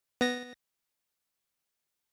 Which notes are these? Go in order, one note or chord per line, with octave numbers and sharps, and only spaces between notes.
B3 A#6